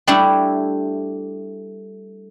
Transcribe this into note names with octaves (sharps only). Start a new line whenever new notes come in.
G3 A3 D4 E4